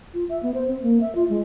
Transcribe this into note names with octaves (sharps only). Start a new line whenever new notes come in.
F4
E5
B3
C5
C4
A#3
E5
F4
G#3